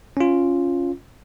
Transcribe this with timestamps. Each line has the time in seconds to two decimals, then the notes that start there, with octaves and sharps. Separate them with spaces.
0.17 C#4 F4